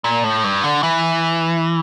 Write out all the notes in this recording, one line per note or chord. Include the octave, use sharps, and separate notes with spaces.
A#2
A2
G2
D3
E3